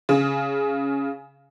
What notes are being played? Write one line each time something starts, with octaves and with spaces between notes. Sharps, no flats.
C#3